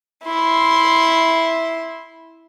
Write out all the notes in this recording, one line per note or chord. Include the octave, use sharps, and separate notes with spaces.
E4 C6